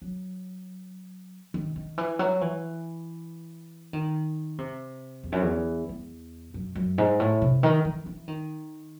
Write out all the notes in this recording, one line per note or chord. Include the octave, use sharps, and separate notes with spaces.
F#3
D#3
D#3
E3
F#3
E3
D#3
C3
E2
F#2
E2
E2
F#2
F#2
G#2
A2
C3
D#3
E3
E3
D#3